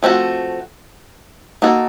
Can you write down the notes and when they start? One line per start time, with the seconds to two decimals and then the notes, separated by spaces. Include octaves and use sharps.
0.03 F3 A3 C4 D#4 F#4
1.62 A#3 D#4 F#4 A4